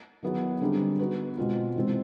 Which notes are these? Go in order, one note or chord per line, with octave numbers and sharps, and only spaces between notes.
D#3 F#3 B3 E4 G#4
D3 G3 C4 D#4 G#4
B3 D#4 F#4 B4
B2 G#3 C4 F4
C3 E3 G#3 C4